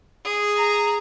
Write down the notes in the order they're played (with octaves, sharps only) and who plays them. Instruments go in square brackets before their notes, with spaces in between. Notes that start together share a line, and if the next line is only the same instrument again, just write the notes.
[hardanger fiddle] G#4
[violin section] A#5